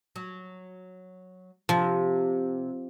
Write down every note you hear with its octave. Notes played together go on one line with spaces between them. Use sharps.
F#3
C3 F3